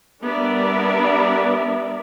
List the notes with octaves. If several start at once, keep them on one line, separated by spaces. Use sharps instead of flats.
G3 B3 D4 A#4 D5 E5